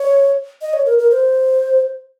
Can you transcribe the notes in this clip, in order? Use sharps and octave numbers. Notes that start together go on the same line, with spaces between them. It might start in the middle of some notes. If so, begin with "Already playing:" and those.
Already playing: C#5
D#5
C#5
A#4
A#4
C5